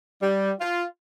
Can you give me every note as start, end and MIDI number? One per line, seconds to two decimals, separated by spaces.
0.22 0.51 55
0.60 0.84 65